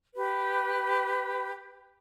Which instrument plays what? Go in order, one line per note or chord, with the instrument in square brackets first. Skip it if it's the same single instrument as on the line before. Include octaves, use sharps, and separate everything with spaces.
[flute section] G4 B4